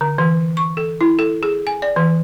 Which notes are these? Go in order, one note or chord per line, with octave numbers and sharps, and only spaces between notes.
D3
E3
C#6
A4
E4
A4
G#4
G#5
D5
E3